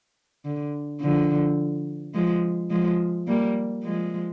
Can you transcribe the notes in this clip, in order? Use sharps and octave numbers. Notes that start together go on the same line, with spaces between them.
D3
D3 F3
F3 G#3
F3 G#3
G3 A#3
F3 G#3